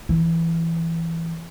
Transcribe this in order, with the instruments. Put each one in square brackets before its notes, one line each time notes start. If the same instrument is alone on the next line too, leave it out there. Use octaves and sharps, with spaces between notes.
[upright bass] E3